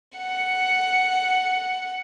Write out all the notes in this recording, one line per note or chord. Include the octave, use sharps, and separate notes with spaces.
F#5 C#7